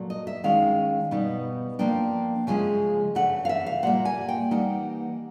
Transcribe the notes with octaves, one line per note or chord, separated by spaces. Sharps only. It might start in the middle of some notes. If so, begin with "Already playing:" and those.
Already playing: A#2 F#3 A3
D#5
E5
D#3 G#3 C#4 E4 F5
B2 G3 B3 D#4
F3 A#3 D4 G5
C#3 F3 G#3 C#4 E4 G#5
C#3 E3 A3 D4 F#5
F5
E5
F5
A#2 G3 A#3 F#5
G#5
G5
E3 G3 A#3 D#4 F#5